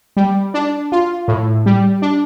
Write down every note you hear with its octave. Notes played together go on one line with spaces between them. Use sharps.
G3
D4
F4
A2
G3
D4